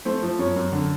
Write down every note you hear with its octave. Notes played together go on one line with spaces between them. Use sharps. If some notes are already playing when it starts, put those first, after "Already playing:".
A3 C5
F3
F#2 C#5
F#2
D3